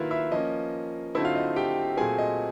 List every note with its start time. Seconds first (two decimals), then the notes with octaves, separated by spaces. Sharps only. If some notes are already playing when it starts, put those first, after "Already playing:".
Already playing: D#3 F#3 A#3 E4 F4 B4 E5 F5
0.11 E4 E5
0.32 F3 A#3 C#4 D#5
1.15 D3 F#3 A3 C4 D#4 E4 E5
1.25 F4 F5
1.35 D#5
1.56 G4 G5
1.97 A#2 F#3 A3 C4 G#4 G#5
2.18 D#5